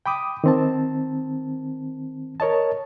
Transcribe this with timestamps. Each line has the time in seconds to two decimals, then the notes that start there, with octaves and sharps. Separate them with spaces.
0.06 G5 B5 D6 D#6
0.44 D#3 C4 A5
2.40 A#4 C#5 D#5 A5